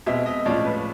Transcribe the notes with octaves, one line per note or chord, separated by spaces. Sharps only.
B2 G#3 C4 E5
D#5
A2 F3 G#3 C#4 D5
B4